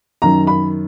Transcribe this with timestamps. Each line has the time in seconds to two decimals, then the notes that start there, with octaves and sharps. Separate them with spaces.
0.22 F#2 D#3 F#3 A#5
0.47 B5